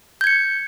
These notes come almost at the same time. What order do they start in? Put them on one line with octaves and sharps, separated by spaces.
G6 G#6 C#7